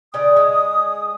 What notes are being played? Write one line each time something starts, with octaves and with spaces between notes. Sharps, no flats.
C#3 D5 F5 D#6
G#3